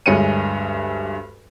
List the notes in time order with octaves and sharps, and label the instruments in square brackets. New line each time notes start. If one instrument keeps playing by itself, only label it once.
[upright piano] D2 G2 G#3 C#5 C#7 D#7